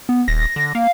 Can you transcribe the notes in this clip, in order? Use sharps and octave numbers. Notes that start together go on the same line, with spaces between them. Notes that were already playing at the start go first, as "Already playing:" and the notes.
B3
D#1 A#6
D3
A#3 F5